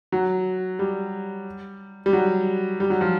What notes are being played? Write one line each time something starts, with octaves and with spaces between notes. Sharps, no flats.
F#3
G3
G3
F#3
G3
F#3
F3